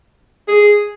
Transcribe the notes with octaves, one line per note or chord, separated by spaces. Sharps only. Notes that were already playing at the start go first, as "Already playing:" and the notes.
G#4